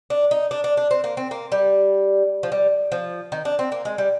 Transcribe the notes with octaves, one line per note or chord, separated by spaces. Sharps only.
D4
D#4
D4
D4
D4
C4
A#3
C4
A#3
G3
F3
G3
F3
D#3
D4
C4
A#3
G#3
G3